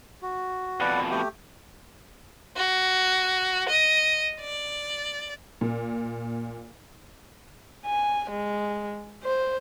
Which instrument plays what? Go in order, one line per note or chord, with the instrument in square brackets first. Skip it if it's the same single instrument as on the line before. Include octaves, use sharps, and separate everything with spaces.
[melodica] F#4
[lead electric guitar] F2 B2 [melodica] B4 D5 F#5
[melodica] A3 G4
[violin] F#4
D#5
D5
[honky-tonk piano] A#2
[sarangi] G#5
G#3
C5